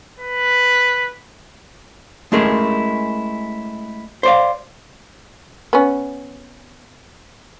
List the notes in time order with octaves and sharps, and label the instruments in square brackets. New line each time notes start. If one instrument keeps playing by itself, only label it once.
[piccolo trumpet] B4
[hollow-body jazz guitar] G#3 A3 C#4 E4 G#4 A#4
C5 D5 F5
[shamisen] B3 C#4